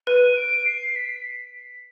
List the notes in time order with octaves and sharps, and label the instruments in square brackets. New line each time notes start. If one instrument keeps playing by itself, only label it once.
[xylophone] B4 [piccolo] D#7
[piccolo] D#7
D7
C7
B6